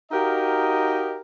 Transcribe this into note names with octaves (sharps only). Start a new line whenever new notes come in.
D#4 F#4 G4 A#4 D#5 F5